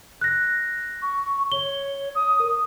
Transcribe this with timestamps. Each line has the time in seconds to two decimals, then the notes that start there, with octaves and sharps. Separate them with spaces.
0.21 F#6 A#6
1.02 C#6
1.52 C#5 G7
2.15 D#6
2.40 A#4